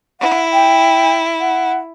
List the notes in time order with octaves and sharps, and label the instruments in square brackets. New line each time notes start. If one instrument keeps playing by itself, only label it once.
[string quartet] E4 [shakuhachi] F#5
[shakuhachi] G5
F#5